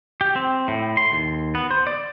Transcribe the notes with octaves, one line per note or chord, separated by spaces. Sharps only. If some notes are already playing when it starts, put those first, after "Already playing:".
G4
C4
A2
C6
D#2
B3
C5
D5